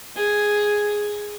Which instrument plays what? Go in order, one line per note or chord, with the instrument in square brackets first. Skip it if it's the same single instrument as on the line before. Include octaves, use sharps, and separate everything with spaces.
[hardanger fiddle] G#4